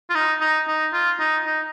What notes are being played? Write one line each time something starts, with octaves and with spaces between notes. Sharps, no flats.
F4
D#4
D#4
D#4
F4
D#4
D#4